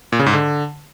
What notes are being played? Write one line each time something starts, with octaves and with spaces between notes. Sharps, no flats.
A#2
C#3
G#2
D3